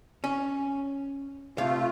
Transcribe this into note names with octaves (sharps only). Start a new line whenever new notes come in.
C#4
C3 A3 F4 F5